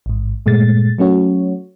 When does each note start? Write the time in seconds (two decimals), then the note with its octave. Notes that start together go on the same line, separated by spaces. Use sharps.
0.06 A1 G#2
0.46 G2 A#2 G#3 A3 A6
0.98 F#3 A3 C#4 F#4 C#5